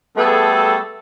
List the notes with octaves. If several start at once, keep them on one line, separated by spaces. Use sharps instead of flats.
G3 A3 B3 G#4 A4